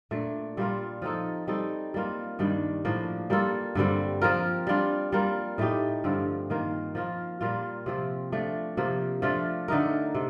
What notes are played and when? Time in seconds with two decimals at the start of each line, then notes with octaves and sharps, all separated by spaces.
0.11 A#2 A3 D4
0.57 A#2 G3 A#3 F4
1.02 F3 C4 D#4 A4
1.47 G3 C4 D#4 A4
1.94 G3 A#3 F4
2.39 G2 D#3 G3 D4
2.85 A2 F3 A#3 D4
3.30 G3 A#3 F4 A4
3.75 G2 D3 G3 C4
4.22 F3 C4 F4 A#4
4.67 G3 D4 F4
5.12 G3 A#3 F4 A#4
5.58 A2 A3 D#4 G4
6.04 G2 D3 F3 C4
6.50 D#3 A#3 F4
6.95 F3 A#3 F4
7.41 A#2 G3 A#3 F4
7.86 C3 F3 C4
8.32 F3 A3 D4
8.77 C3 F3 A#3
9.22 F3 A3 D4 F4
9.68 D3 A3 D#4 A#4
10.15 C3